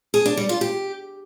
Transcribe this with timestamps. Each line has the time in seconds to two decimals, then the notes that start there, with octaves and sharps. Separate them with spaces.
0.14 G#4
0.26 D4
0.37 G3
0.49 F4
0.61 G4